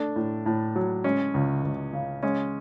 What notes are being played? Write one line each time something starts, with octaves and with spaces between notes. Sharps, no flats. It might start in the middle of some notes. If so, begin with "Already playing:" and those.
Already playing: A3 D4
A2
A2
F#3
G#3 C#4
C#2
C#2
C#3
G#3 C#4